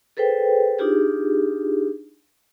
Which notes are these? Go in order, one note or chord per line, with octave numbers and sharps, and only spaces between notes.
G#4 A4 B4 C5 G5
D4 D#4 F4 G4 G#4